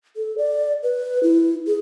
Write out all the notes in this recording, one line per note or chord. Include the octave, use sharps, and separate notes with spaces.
A4
D5
B4
E4
G#4